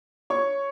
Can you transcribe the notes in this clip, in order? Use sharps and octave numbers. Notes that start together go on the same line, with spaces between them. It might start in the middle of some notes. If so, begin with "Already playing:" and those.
C#5 C#6